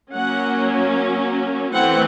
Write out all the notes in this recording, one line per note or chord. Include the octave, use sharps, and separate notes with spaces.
F#3 A#3 C#4 F#5
E3 A3 C4 F#5